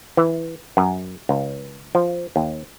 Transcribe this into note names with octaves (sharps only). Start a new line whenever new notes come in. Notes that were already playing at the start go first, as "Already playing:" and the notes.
E3
F#2
C#2
F3
D#2